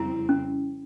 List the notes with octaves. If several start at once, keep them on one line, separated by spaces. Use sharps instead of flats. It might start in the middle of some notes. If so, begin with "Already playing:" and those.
Already playing: F2 C#3 G3 C4 E4
C#4